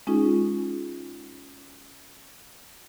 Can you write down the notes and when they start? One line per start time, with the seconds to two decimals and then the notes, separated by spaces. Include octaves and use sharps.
0.07 G#3 C#4 D#4 F4 G#4